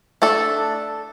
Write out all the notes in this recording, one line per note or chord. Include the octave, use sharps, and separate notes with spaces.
A3 D4 A4